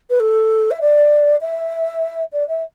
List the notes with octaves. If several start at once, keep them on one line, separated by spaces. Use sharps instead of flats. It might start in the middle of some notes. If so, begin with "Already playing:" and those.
B4
A4
E5
D5
E5
D5
E5